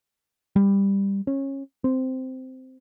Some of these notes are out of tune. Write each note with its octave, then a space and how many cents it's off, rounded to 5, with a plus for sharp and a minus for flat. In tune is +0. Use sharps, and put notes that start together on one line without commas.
G3 +10
C#4 -20
C4 -10